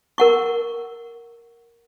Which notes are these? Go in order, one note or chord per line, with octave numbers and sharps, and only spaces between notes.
A#4 F#5 C#6